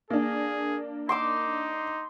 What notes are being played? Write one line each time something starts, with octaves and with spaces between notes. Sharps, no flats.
A#3 D4 G#4
D#4 C6 D6 E6